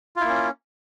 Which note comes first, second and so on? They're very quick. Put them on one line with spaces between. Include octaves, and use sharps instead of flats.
F4 E4 A#3 C#4